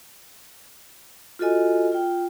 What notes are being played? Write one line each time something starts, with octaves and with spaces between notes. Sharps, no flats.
F4 F#4 A4 D#5 G#5
F4 G5